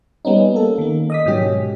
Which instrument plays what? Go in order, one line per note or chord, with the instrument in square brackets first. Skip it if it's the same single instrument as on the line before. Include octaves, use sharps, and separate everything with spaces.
[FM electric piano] G3 B3 C#4 D#4
A#3 A4
D#3 A#3
D#5 D#6 B6
G#2 B2 F#3 C#4 G4